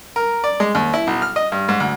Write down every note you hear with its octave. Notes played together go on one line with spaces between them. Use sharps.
A#4
D5
G#3
D#2
E4
B1
F6
D#5
G2
G#2
D2